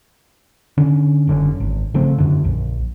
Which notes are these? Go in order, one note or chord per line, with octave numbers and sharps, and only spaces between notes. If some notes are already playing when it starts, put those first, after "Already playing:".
D3 C#4
F#1 D3 C#4
G#1
C#3 F3 A3 C4
F#2 D3
A#1